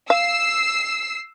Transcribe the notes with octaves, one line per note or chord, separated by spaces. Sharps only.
F5 E6 C7